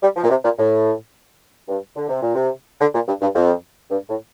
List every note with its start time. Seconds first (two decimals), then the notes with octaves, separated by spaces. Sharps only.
0.02 G3
0.16 F3
0.24 A#2
0.29 C3
0.44 A#2
0.58 A2
1.68 G2
1.96 D3
2.09 C3
2.22 A#2
2.35 C3
2.80 D3
2.94 A#2
3.07 G2
3.21 G2
3.35 F2
3.91 G2
4.09 A2